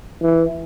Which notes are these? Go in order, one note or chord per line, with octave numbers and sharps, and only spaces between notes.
E3